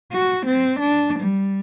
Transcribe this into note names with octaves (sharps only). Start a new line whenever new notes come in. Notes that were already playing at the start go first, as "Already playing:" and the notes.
F#4
C4
D4
G3